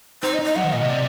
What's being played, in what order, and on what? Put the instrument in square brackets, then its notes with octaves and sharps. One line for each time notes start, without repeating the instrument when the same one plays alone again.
[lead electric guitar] D#4 [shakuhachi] C5
[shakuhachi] D#5
[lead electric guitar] D#4
[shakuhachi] D#5
[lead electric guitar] F#3 [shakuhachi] F#5
[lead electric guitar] D#3
[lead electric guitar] A#2 [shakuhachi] D#5
[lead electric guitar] C3
[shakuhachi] D5